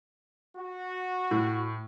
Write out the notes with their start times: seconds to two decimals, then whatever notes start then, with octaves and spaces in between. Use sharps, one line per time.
0.56 F#4
1.31 A2